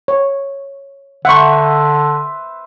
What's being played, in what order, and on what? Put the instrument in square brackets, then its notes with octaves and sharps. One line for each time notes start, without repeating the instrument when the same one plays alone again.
[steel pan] C#5
[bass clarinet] D3 [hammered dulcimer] B4 C5 E5 [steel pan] F#5 C#6